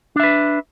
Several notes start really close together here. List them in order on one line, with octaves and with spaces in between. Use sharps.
D4 E5 B4